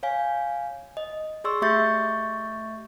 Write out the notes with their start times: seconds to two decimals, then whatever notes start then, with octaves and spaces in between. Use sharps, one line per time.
0.03 C#5 F5 G#5
0.97 D#5
1.44 G#4 D5 C6 C#6 E6
1.62 A3 G4 E5 C#6 G6 A6